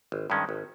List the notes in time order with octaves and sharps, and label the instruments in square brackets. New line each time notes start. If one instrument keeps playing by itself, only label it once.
[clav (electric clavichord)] G#1
G2 D#3 G#3 C#4
G#1